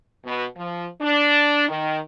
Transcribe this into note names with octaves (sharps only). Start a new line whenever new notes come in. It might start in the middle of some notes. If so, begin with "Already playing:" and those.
B2
F3
D4
D#3